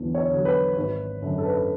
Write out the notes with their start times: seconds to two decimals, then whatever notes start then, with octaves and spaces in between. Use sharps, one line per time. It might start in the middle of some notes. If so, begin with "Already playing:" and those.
Already playing: E2 D3 F#3
0.15 C#5
0.30 D3 F#3
0.45 B4
0.75 G#1 B4
1.22 F#2 D3
1.38 A4
1.45 B4
1.54 A4